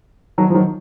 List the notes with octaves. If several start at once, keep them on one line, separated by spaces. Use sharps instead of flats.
D#3 F#3
F3
D#3 F#3